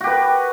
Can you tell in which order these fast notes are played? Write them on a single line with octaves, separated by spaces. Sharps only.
F#4 G4 B4